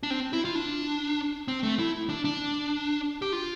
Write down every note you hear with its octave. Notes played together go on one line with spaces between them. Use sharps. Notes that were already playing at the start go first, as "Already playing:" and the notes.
D4
C4
E4
F4
D4
C4
A3
E4
D4
D4
G4
F4